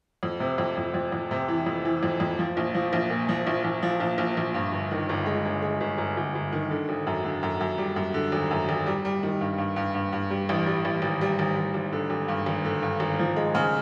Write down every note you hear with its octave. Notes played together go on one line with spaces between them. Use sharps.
F2
C3
F2
F2
F2
F2
C3
E3
F2
E3
F2
F2
F3
A#1
F3
A#1
A#2
F3
A#1
A#1
F3
A#1
A#1
A#1
G2
G1
D#3
G1
G#3
G1
G#3
G1
G1
G1
G1
D#3
D3
G#1
F#2
D3
F#2
F#2
G3
F#2
D3
G#1
F#2
G#1
G3
G3
D#3
G2
G2
G2
G2
G2
G3
A1
G3
A1
G#1
G3
G#1
G#1
G#1
D3
G#1
G2
G#1
D3
G2
G#1
F3
G#3
C#3